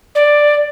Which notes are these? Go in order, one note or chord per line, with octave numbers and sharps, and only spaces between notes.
D5